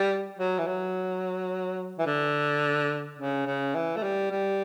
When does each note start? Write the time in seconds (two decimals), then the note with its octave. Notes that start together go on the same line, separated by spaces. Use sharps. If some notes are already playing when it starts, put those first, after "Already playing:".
Already playing: G3
0.39 F#3
0.58 E3
0.67 F#3
1.98 E3
2.06 D3
3.19 C#3
3.46 C#3
3.75 E3
3.96 A3
4.03 G3
4.31 G3